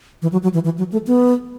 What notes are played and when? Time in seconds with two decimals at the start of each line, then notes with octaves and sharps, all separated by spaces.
0.22 E3
0.32 F#3
0.43 F#3
0.54 E3
0.64 E3
0.78 F#3
0.92 A3
1.07 B3